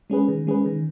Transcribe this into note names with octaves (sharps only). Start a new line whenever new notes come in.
G#3 C#4 G#4 B4
D#3
G#3 C#4 G#4 B4
D#3